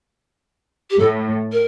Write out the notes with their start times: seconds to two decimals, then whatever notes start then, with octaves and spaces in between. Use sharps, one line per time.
0.91 G4
0.99 A2 A4
1.53 A#4